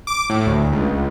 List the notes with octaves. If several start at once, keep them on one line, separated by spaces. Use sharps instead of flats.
D6
A2
D2
C#2